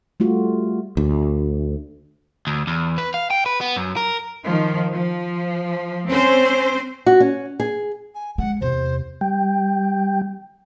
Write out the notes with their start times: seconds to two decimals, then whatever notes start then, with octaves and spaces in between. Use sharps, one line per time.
0.20 G3 A3 F4 F#4
0.97 D2
2.47 D2
2.67 E2
2.98 B4
3.14 F5
3.31 G5
3.46 B4
3.61 B3
3.76 F#2
3.96 A#4
4.44 D#3 F3
4.93 F3
6.07 C4 C#4 C5
7.06 F#4
7.20 C#4
7.60 G#4
8.15 G#5
8.38 G#3 A3 F#5
8.61 E2 C3 C5
9.21 G3 G5